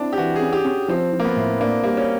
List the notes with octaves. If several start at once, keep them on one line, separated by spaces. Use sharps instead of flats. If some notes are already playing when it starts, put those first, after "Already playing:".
Already playing: C4 D4 E4
G4
E3 F#4
G#4
C#4
G4
C#4
F3 C4
F3
A#3
B3
A2
A#3 D4
G3 A#3
C#4